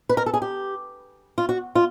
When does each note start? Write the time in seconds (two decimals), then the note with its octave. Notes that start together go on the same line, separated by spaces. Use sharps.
0.09 B4
0.17 A#4
0.26 A4
0.33 G#4
0.42 G4
1.38 F4
1.49 F#4
1.75 F4